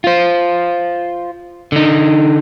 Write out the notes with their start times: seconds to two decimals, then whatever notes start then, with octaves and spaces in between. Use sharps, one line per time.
0.04 F4 C5
1.72 D3 D#4